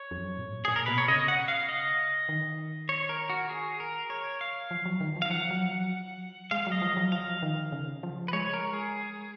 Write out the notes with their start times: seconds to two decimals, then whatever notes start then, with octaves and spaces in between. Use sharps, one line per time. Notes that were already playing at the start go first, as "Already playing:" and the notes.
Already playing: C#5
0.11 F2
0.18 F#2
0.38 A#2
0.48 G#2
0.65 A#2 G#4
0.76 A#4
0.86 B2 B4
0.98 C#5
1.08 C#3 D#5
1.28 F#5
1.48 F5
1.69 D#5
2.29 D#3
2.89 C#5
3.09 A#4
3.29 F#4
3.50 G#4
3.80 A#4
4.10 C#5
4.41 F5
4.71 F3
4.85 F#3
5.01 D#3
5.16 F3
5.22 F5
5.30 F3 F#5
5.51 F#3
5.64 F3
5.71 F#3
6.51 G#3 F5
6.67 F#3
6.72 D#5
6.82 F3
6.97 F#3
7.12 F3 F5
7.42 D#3
7.72 C#3
8.03 F3
8.28 B4
8.33 G#3 C#5
8.54 A#4
8.73 G#4